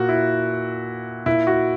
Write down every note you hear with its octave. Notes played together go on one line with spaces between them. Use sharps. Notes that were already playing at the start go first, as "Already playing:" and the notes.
Already playing: A#2 F#4
E4
A#2 E4
F#4